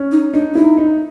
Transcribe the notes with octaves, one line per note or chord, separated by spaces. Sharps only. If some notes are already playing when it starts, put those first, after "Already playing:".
Already playing: C#4
D#4
D4 D#4
D#4 E4
D#4